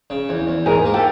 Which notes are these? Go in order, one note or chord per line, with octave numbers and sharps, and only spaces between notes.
C#3
E2
E2
G#2 G#4 A#4
A#3
G4 A4